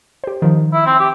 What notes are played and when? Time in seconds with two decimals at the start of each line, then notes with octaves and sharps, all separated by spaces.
0.24 G4 C5
0.42 D#3 F3
0.73 E4
0.86 C4
1.00 G4